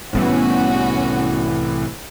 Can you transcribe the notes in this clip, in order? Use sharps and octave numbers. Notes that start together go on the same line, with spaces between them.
C2 A2 E3 G3 B3 C#4 F#4